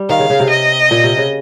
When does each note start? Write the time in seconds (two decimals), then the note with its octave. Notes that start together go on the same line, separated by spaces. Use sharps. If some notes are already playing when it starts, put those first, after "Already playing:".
Already playing: G3
0.09 D#3 F5
0.19 C#3
0.30 C#3
0.40 C3
0.50 D#5
0.91 A#2
1.04 C3
1.18 C#3